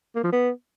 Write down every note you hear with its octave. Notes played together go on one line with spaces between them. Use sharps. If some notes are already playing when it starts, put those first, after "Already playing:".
A#3
F3
B3